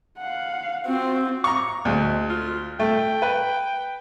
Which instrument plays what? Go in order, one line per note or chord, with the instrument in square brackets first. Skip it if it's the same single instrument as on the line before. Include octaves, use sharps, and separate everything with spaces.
[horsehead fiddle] F5 F#5
[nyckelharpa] C4 [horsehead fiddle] F4 F#4
[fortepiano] A#5 C#6
[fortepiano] D2 [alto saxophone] G#3
[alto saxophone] F4
[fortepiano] A3 [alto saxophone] G5
[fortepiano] B4